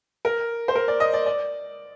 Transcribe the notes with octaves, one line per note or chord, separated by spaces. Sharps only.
A#4
C5
A#4
D5
D#5
D5
D5